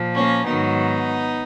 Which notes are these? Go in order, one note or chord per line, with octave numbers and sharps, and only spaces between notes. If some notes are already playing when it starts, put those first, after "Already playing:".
Already playing: A#2 F3
A#3 C#4
G#2 D#3 F#3 B3 D#4